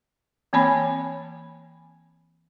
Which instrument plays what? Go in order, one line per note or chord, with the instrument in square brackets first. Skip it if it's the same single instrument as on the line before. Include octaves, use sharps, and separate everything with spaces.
[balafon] E3 A#3 C4 C#5 G#5 B5